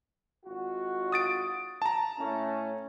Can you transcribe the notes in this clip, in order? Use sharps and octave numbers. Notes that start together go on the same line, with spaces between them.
G#1 F4 F#4
D#6 A6 D7
A5 A#5
A2 A3 C#4